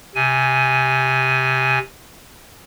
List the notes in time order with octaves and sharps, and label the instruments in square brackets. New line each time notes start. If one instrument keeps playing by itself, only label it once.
[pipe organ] C3 G#5